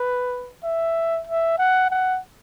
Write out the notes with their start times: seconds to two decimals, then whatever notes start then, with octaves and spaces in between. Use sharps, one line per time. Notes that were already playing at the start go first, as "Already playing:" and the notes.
Already playing: B4
0.64 E5
1.27 E5
1.58 F#5
1.90 F#5